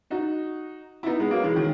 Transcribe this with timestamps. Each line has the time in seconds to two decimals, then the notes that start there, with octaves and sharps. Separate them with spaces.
0.10 D#4 F#4
1.03 E4
1.06 B3 D#4
1.20 G#3 B3
1.31 F#3 A#3
1.44 E3 G#3
1.56 D#3 F#3